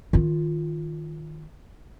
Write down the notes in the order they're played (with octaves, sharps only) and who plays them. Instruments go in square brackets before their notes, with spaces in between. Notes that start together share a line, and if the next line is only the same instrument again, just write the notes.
[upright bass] D#3 F4